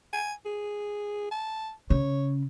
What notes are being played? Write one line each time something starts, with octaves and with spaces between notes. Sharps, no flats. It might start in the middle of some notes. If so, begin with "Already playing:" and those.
G#5
G#4
A5
C#3 C#5